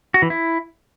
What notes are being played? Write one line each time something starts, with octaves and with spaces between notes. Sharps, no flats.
F#4
E3
E4